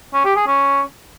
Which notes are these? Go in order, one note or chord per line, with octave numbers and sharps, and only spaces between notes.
C#4
G4
G#4
C#4